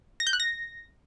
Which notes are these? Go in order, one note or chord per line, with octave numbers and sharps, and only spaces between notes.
A#6
G6
F#6
A#6